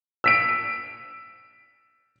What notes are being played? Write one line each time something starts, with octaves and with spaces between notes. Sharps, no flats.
E6 B6 D7